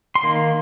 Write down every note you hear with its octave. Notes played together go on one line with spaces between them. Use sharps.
C6
D#3 A#3